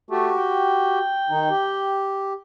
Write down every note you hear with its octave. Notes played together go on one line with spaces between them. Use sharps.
A3 F#4 G4
G5
D#3 D#4
G4